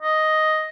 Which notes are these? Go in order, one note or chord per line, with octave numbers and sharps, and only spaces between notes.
D#5